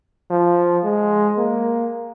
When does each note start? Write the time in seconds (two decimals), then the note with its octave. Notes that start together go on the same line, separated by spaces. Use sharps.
0.30 F3
0.84 G#3
1.38 A#3